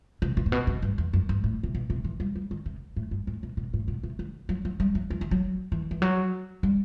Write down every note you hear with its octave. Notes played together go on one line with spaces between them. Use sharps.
C3
B2
A2
B2
C3
G2
E2
F#2
G2
A2
C3
B2
C3
E3
G3
G3
D#3
C3
A2
G2
A2
B2
B2
A2
B2
C3
D#3
F#3
F#3
G3
F#3
E3
D#3
F#3
E3
E3
F#3
G3